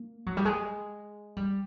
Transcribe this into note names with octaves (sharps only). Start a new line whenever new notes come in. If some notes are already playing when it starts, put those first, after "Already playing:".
Already playing: A#3
F#3
G3
G#3
G3